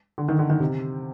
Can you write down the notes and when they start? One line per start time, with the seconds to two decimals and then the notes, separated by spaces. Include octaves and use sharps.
0.18 D3
0.29 D#3
0.39 D3
0.50 D#3
0.60 C3